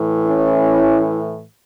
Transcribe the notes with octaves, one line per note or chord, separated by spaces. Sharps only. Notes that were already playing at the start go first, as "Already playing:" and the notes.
Already playing: A2 E3
C#4 E4